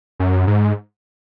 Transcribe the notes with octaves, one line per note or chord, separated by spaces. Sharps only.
F#2
G#2